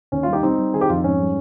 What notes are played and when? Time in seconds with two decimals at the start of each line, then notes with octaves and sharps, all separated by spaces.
0.12 D#2 C#4
0.23 G3 F4
0.33 D#4 G4
0.43 G3 C4 D#4
0.58 G3
0.73 D#3 G#4
0.81 G4
0.89 F2 F4
0.96 D#4
1.04 G#2 C#4
1.19 G3